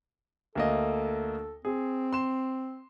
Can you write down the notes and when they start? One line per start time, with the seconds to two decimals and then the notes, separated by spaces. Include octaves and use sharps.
0.55 D2 A#3 A4 D#5
1.65 C4 G#4
2.13 C6 E7